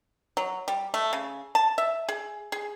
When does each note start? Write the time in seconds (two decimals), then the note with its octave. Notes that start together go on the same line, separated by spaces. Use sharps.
0.37 F#3
0.68 G3
0.94 A3
1.13 C#3
1.55 A5
1.78 E5
2.09 G#4
2.52 G#4